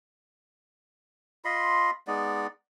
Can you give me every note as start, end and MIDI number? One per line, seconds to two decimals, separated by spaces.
1.45 1.91 65
1.45 1.91 75
1.45 1.91 83
1.45 1.91 84
2.07 2.47 56
2.07 2.47 59
2.07 2.47 63
2.07 2.47 74